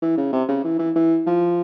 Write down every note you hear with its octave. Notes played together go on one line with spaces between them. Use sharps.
E3
C#3
C3
C#3
E3
E3
E3
F3